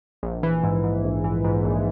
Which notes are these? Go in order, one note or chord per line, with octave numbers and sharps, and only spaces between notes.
A#1
E3
G#2
G#2
A#1
E3
G#2
A#1